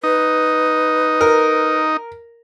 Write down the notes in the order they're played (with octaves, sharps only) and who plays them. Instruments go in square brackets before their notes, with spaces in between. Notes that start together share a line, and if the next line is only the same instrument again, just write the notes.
[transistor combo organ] D#4 [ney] B4
[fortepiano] A#4